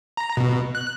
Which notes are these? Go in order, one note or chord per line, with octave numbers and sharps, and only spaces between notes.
A#5
B2
F#6